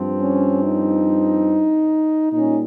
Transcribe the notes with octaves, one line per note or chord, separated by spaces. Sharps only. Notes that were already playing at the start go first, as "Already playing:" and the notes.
Already playing: G2 F3 C4
C#4
D#4
A#2 G3 C#4 D#4